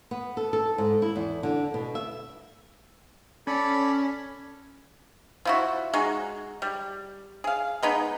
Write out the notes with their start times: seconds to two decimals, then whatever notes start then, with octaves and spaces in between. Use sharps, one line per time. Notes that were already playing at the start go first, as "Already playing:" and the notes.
0.11 B3
0.37 A4
0.53 A4
0.78 G#2
1.02 E4
1.16 E2
1.43 D3
1.74 B2
1.95 E5
3.47 C#4 A4 D5 B5
5.45 F3 E4 F#4
5.94 G#3 D#4 F#4
6.62 G3
7.44 G#4 F5
7.83 G#3 B3 D#4